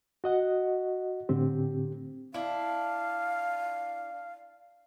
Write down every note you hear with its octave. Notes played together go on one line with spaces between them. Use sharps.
F#4 D#5 F#5
A2 D3 C4 G4
D4 E4 F5